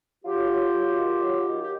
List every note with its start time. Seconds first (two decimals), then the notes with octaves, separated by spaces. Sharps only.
0.24 F#3 F4 G4
0.49 F#3
0.73 F#3
0.98 D#3
1.22 F#3
1.47 D#3
1.63 G4